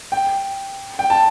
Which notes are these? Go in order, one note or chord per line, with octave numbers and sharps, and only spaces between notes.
G5
G5
A5